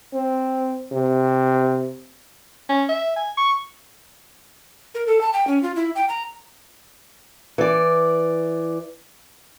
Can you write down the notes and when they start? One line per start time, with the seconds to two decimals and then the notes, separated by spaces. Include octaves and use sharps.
0.13 C4
0.92 C3
2.69 C#4
2.89 E5
3.16 G#5
3.37 C#6
4.95 A#4
5.07 A4
5.21 A5
5.33 G5
5.47 C#4
5.63 F4
5.76 E4
5.95 G5
6.09 A#5
7.58 E3 D5